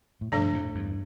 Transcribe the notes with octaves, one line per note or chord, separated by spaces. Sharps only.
A2
G2 B2 F3 A3 D4 A4 D5
F2 A2
E2 G2